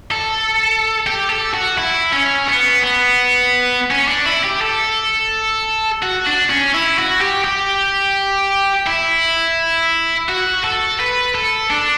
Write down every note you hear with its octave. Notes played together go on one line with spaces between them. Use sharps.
A4
G4
A4
F#4
E4
C#4
B3
B3
C#4
D4
E4
G4
A4
F#4
D4
C#4
E4
F#4
G4
G4
E4
F#4
A4
B4
A4
D4